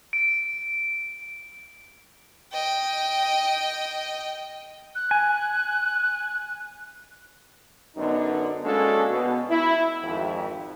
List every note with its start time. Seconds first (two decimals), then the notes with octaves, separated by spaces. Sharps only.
0.13 D7
2.52 D#5 G5
4.95 F#6
5.11 G#5
7.96 F#2 D3 B3 D#4
8.64 G#3 A#3 C#4 D4 F#4 A4
9.10 B2
9.50 E4
10.02 G#1 F2